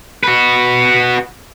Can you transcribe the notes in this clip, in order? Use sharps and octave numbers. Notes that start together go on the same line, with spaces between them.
F#4 B4